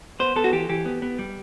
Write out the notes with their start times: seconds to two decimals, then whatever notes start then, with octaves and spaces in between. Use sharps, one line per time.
0.20 B3 C5
0.36 B3 A4
0.44 F#4
0.53 E3 G4
0.69 E3 G4
0.85 B3
1.02 B3
1.19 G3